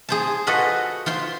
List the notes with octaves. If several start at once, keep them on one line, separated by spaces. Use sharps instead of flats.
G#4 C5 A5
F4 F#4 A4 B4 D#5
F4 C5 C6